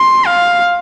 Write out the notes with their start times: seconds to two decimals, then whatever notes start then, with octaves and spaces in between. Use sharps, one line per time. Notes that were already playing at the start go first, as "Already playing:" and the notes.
Already playing: C6
0.27 F5